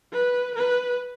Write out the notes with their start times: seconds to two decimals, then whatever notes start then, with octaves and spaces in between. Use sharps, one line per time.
0.12 B4
0.55 B4